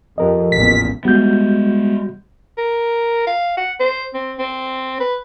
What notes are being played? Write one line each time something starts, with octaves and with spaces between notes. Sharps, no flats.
F2 G4 A#4 D#5
A1 E2 A#2 B6
G3 G#3 B3 F#4 G6
A#4
F5
F#5
C5
C4
C4
B4